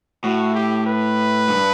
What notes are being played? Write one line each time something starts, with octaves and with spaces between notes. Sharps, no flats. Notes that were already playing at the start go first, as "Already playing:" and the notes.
A2 F#4
G4
B4
G2